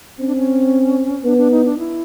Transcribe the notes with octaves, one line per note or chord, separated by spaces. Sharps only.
C4 C#4
D4
C#4
B3 D4
D4
D#4
D4
E4